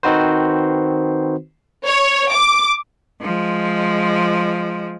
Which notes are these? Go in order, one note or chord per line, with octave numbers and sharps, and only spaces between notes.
D#3 C4 D#4 F#4 B4 C5
C#5
D6
F3 G#3